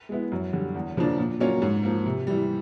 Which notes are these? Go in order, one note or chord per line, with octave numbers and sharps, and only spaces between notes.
G#3 B3 E4
F#2
D3 G3
E2
C#3 F3 A#3 D4
A#2
F#3 A#3 C#4 F4
G#2
F3 A#3
C3
E3 G3